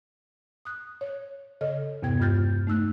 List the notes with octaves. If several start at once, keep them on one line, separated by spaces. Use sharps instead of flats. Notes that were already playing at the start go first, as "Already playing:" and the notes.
D#6 F#6
C#5
C#3 A4 C#5 D#5 F6
E2 G2 C3 B3 G5 G#6
G2 G#3 F4 F6 G6 A6
A3 D#4 E6 F#6